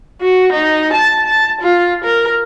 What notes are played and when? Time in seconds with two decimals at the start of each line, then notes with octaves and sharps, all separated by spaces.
0.21 F#4
0.53 D#4
0.93 A5
1.26 A5
1.61 F4
2.04 A#4